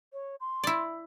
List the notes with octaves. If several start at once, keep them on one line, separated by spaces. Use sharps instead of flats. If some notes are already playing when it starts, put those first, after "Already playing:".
C#5
C6
E4 D5